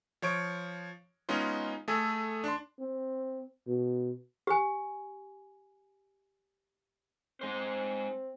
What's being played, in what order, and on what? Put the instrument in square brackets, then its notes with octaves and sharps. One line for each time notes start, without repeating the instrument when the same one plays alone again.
[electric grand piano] F3 C#5 C#6 D7
G#3 B3 C#4 D#4 F4
A3 G#4 A4 G#5
D4 C6
[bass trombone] C4
B2
[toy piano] G4 G#5
[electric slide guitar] G#3 C5 [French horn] C4